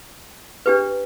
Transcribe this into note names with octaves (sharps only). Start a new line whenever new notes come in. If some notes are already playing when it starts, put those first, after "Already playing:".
D4 G4 B4